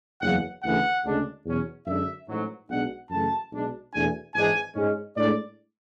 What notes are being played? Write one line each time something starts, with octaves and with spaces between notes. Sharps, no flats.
F#1 E2 C#3 F#3 F#5
D2 C#3 E3 A3 F#5
D2 C#3 G#3 D4
E2 B2 F#3 C#4
F#2 D3 G#3 D4 E5
A1 G#2 F#3
B1 B2 G#3 D4 F#5
F#2 C#3 E3 A3 A5
B1 B2 G#3 D4
E2 B2 A3 D4 G#5
G#1 G#2 E3 G#3 D4 G#5
G#2 G#3 C#4
A2 G#3 D4 D5